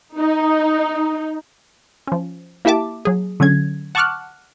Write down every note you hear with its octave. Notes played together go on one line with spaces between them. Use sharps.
D#4
F3 C#4
A#3 E4 G4 E5 A5 D6
F#3 G#4
D3 F#3 C#4 G#6
F#5 A5 C#6 D6 F6 F#6